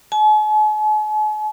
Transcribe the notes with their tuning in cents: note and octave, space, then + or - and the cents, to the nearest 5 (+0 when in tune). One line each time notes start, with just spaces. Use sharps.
G#5 +45